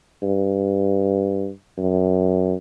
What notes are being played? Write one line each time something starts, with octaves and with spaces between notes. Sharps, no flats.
G2
F#2